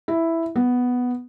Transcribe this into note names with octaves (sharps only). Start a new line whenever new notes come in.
E4
B3